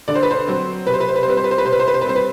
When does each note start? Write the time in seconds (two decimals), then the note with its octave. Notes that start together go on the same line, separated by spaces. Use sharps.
0.08 D3 D5
0.15 C5
0.23 B4
0.31 C5
0.47 F#3 C4
0.87 C3 B4
0.94 C5
1.00 B4
1.09 C5
1.16 B4
1.23 C5
1.26 G3 C4 B4
1.37 C5
1.44 B4
1.51 C5
1.58 B4
1.65 C3 C5
1.73 B4
1.80 C5
1.88 B4
1.94 C5
2.01 B4
2.04 G3 C4 C5
2.16 B4